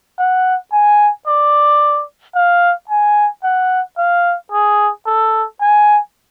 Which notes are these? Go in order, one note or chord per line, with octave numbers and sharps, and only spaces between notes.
F#5
G#5
D5
F5
G#5
F#5
F5
G#4
A4
G#5